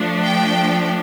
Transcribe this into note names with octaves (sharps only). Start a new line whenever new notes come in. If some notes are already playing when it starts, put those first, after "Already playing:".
Already playing: F3 A3 D4
G5